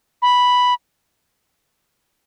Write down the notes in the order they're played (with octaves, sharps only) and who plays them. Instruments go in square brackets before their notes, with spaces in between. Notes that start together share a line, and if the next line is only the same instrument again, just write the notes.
[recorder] B5